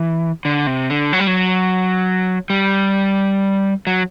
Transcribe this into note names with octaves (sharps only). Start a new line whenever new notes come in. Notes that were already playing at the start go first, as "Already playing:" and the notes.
Already playing: E3
D3
C3
D3
F#3
G3
F#3
G3
F#3